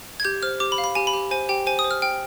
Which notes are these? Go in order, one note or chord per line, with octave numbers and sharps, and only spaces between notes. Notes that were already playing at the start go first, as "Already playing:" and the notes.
G#6
G4 G6
C5 F6
G4 D6
B5
F5
B5
G4 G#5
B5
G4
C5 G#5
G4 G5
C5 G#5
D#6
C5
F6
G5 F6